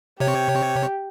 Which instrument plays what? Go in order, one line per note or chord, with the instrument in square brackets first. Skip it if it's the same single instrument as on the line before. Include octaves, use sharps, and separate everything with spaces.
[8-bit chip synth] C3 C#5 [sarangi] G4